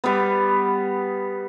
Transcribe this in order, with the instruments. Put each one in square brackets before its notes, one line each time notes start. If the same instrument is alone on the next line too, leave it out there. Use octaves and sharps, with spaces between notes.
[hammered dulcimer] G3 B3